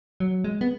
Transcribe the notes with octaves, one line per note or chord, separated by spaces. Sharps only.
F#3
G#3
B3